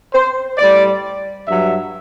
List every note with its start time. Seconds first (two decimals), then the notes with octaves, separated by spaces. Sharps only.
0.13 C5
0.58 A2 G3 D5
1.48 G2 F#3 E5